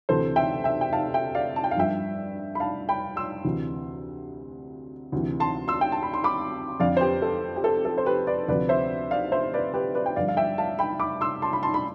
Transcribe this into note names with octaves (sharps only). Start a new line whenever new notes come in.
D2 C3 E3 A4 C5
E5 G5
E5 G5
G5
F5 A5
E5 G5
D5 F5
A5
G5
F5
G2 F3 E5 G5
B5
F5 A5
G5 B5
C6 E6
D2 C3 E3
D2 C3 E3
A5 C6
C6 E6
G5
A5
B5
C6
B5 D6
F2 D3 F3 D5 F5
C5
G4 B4
A4
G4
A4
A4
C5
G4 B4
B4 D5
D2 C3 F3 B4 D5
C5 E5
D5 F5
C5 E5
B4 D5
G4 B4
B4 D5
G5
G2 D3 F3 D5 F5
F5
E5 G5
F5 A5
G5 B5
B5 D6
C6 E6
A5 C6
B5
A5 C6
B5